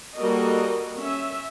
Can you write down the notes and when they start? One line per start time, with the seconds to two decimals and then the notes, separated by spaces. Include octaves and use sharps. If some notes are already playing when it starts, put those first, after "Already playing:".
0.17 G3 A#3 F#4 A4 A#4 D#5
0.99 C#4 E5